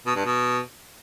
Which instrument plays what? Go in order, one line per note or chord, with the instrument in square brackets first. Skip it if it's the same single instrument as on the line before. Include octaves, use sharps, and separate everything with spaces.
[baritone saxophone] B2
G2
B2